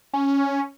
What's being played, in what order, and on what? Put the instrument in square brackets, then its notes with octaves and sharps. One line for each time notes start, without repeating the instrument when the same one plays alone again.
[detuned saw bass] C#4